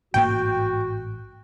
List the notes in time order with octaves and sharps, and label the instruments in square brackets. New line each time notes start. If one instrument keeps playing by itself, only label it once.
[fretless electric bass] A1 G#2 A#3 [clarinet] F#4 [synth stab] G5